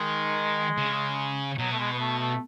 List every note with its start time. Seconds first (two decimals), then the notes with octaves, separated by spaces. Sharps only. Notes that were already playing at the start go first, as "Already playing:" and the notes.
Already playing: D#3 G#3
0.78 C#3
1.58 B2 F#3
1.72 A3
1.79 G#3
1.93 B3
1.99 A3
2.19 A3